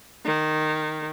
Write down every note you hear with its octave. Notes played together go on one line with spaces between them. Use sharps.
D#3